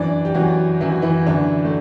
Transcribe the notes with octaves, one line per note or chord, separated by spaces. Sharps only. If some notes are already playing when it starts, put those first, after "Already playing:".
Already playing: F#2 E3 D4 D5
G4
F#2 E3 F#3 F#4
F#2 E3 E4
F#4
E3 E4
F#2 D3 E3 D4
A3